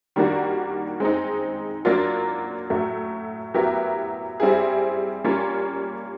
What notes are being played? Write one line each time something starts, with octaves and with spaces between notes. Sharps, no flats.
D#3 G3 A#3 D4 F#4
G#3 C4 D#4
F#3 A#3 D4 F4 A#4
A2 F#3 A3
F#3 B3 E4 G4 A#4
G3 C4 E4 G#4
G3 A#3 C#4 F4